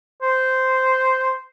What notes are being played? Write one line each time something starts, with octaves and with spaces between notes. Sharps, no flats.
C5